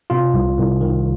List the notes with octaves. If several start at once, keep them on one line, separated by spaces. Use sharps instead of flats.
C3 F4
C2
C2
D#3